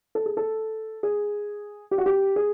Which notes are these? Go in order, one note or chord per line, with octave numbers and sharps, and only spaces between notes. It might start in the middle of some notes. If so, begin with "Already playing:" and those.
A4
G#4
A4
G#4
G4
F#4
G4
G#4